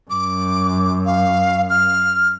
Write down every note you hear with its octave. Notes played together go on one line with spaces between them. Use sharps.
F#2 D6
F5
F6